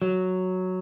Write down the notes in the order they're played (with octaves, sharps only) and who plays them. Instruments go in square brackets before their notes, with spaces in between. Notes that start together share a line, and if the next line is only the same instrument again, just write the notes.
[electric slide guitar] F#3